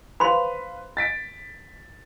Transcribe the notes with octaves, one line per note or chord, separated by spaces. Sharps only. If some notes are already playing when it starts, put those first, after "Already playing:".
B4 C5 F5 B5 C6
A6 B6 D7